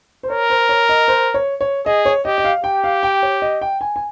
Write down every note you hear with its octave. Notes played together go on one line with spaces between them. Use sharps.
C5
A#4 C#5
C5
C#5
D#5
C5
C#5
C#5
G#4 D#5
C#5
G4 D#5
D#5
F5
G4 G5
F5
G5
C#5
D#5
G5
G#5
G#5